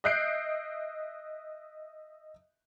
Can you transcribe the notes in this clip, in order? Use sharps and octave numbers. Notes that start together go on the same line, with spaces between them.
D#5 E5 F#6 G6 C7 D7